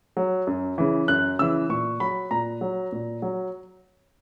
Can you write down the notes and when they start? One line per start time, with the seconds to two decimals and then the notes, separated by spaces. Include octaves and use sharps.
0.17 F#3
0.47 F#2
0.78 C#3 E3
1.08 F#2 F#6
1.39 C#3 E3 E6
1.69 A#2 C#6
2.00 F#3 B5
2.31 A#2 A#5
2.61 F#3
2.92 A#2
3.22 F#3